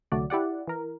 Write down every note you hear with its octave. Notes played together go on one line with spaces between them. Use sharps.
C2 D3 F#3 A3 F#4 D5
E4 G4 D5 F#5
E3 A#4